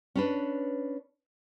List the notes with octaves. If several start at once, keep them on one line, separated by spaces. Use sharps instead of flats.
C#4 D4 B4